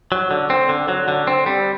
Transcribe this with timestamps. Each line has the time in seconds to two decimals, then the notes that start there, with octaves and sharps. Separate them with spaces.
0.12 F#3
0.31 D3
0.50 C4
0.69 D3
0.88 F#3
1.08 D3
1.27 C4
1.46 G3